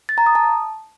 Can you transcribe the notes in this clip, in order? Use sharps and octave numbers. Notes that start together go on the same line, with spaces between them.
A6
A#5
D#6
A5